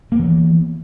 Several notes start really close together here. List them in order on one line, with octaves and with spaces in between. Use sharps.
A#3 B3 E3